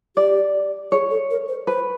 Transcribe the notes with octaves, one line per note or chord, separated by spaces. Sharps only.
G4 D5
G#4 C#5
A4
A#4
C5
B4 C5